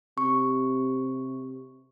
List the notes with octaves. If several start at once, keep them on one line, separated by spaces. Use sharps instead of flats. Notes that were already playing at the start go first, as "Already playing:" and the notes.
C3 C#6